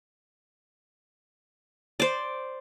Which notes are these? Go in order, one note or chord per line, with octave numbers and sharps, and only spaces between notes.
C5 D5